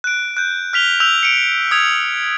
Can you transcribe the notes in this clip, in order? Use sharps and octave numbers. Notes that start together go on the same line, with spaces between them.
F#6 D7
F#6 G6
F6 B6 F7 G7
E6 G6 F7
C#7 D7 F7
D#6 G#6 F7